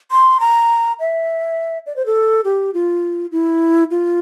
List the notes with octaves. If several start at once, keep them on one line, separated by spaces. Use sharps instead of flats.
C6
A#5
E5
D5
C5
A4
G4
F4
E4
F4